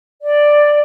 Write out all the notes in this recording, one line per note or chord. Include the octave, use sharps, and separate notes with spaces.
D5